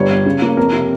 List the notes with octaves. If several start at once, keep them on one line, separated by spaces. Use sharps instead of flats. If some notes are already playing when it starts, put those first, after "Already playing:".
Already playing: G1 G3 C#5
G1
C#3
A#3
F2 A#4
C3